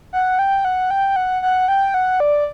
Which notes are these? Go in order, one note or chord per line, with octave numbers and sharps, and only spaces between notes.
F#5
G5
F#5
G5
F#5
F#5
G5
F#5
D5